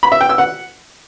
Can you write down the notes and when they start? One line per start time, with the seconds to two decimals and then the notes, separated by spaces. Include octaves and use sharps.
0.03 B5
0.12 E5
0.21 G5
0.29 E6
0.38 F#5